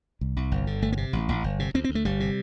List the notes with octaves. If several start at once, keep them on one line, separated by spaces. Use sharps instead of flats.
C2
C2
G1
D3
G1 A3
A#3
C3
A1
A1
G1
C3
D2 C4
C4
D2
A3
G1 G3
C3